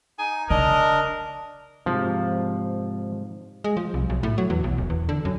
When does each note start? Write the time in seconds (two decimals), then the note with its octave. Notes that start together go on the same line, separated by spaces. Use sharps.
0.19 D#4 G#5
0.50 C#3 D4 A#4 D#5
1.86 G#2 C3 F3
3.64 G#3
3.77 F3
3.94 C2
4.10 B1
4.23 A2
4.38 F#3
4.50 E2
4.64 B1
4.78 E1
4.90 E2
5.09 D3
5.25 F#2